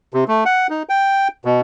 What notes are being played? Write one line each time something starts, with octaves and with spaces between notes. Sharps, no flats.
C3
A3
F#5
D#4
G5
B2